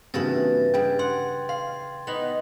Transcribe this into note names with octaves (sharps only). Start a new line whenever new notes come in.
G2 C#3 E3 A#3 C4 F#4 A6 A#6
C#3 G3 G5 G#6
F#5 C6
F5 C6
B3 D#4 F#7